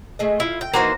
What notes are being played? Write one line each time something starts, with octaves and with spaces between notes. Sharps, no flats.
A3 G#4 D#5
E4 F4
G5
E3 A#3 D#4 F#4 C5 C#5